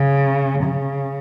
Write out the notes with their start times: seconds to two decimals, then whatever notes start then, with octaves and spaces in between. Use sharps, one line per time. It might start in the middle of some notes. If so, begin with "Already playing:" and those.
Already playing: C#3
0.63 C#3